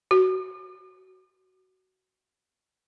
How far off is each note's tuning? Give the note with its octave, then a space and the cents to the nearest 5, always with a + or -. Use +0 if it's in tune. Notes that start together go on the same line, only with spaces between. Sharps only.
F#4 +15